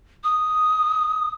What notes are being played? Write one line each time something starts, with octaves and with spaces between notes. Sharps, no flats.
D#6